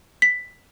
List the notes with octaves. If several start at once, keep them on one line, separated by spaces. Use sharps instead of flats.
B6